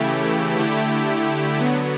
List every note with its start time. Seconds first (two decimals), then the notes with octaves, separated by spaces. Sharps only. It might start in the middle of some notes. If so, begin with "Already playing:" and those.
Already playing: C#3 E3 A3 E4 G4
0.56 D3 A3 E4 G4
1.57 D3 F#3 B3